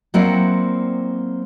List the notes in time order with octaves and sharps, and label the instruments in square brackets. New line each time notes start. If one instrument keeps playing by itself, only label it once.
[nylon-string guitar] F#3 A#3 C4 E4 D5 F#5